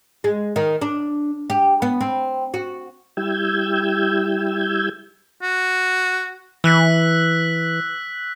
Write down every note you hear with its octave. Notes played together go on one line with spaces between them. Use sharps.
G#3
D#3
D4
G4
B3
C4
F#4
G3 E4 G4 E6 G6 G#6
F#4
E3 E6 F#6 B6